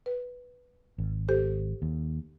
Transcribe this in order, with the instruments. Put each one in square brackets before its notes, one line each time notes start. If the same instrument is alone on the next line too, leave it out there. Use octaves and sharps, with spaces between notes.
[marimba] B4
[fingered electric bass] G#1
[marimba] G4 A4 C5
[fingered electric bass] D#2